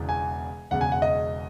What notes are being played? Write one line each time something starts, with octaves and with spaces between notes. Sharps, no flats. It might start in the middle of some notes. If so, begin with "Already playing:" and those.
Already playing: E1 E2 C#3 E3
G#5
E1 E2 C#3 F#5
G#5
F#5
D#5